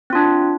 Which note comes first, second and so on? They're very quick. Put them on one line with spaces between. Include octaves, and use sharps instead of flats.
C4 F4 D4